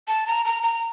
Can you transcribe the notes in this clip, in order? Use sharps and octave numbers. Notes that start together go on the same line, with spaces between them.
A5
A#5
A#5
A#5